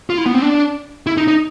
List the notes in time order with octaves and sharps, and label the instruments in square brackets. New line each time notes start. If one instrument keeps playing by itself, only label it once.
[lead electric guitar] F4
E4
B3
C4
D4
E4
D#4
D#4